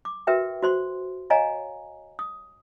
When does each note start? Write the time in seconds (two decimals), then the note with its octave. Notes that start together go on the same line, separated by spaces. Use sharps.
0.05 D6
0.27 F#4 A#4 B4 E5 G5
0.62 F#4 C5 C6
1.30 C#5 D#5 F5 G#5 A#5
2.19 D#6